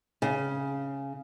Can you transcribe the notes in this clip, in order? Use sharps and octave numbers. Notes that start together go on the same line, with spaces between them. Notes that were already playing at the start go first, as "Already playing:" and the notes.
C#3